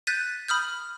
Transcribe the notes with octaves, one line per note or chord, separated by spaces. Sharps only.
F#6 G6 A6 B6 D#7
B5 D#6 F6 G6